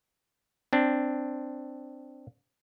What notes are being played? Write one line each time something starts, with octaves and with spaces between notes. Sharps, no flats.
C4 D4